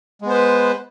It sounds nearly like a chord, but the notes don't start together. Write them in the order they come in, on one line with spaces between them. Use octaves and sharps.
G#3 B3 C5 B4